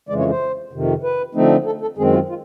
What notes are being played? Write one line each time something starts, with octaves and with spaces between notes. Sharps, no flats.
F2 C#3 E3 G#3 D5
C#5
C5
F2 C3 D#3
B4
D3 F3 A3 C4 D#4
A4
A4
F#2 D#3 G#3 C4 G#4
F4
F4